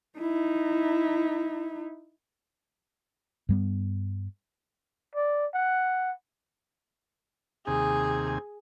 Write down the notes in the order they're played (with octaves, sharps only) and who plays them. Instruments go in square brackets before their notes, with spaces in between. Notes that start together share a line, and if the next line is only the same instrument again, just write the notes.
[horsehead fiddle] D#4 E4
[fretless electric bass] G2 G3 B3
[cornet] D5
F#5
[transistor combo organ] D#2 C3 G#5 [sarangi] G#4